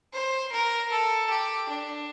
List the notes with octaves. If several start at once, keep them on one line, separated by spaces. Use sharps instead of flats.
C5
A#4
A4
G4
D4